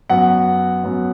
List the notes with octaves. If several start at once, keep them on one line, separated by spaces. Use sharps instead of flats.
F#2 F#3 B3 F#5
F#2 F#3 B3